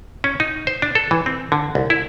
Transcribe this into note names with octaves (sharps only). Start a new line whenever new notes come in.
C#4
D#4
C5
D4
A4
E3
C4
D3
C2
E4